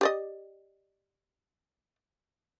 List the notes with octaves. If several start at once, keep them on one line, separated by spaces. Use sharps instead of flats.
G4 D5 D#5